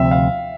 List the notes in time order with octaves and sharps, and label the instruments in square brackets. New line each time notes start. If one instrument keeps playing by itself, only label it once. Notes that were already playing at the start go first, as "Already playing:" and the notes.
Already playing: [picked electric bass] D2 C3 F3 C4 [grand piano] E5
[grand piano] F5